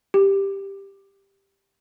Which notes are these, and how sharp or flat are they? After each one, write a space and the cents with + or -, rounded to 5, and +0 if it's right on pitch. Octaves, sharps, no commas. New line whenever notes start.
G4 +5